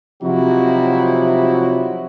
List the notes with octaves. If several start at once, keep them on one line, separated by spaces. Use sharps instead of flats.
C3 F3 F#3 D#4 E4 F#4